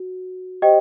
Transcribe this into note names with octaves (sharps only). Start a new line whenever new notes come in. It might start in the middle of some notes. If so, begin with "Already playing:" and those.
Already playing: F#4
G4 C5 D#5 G5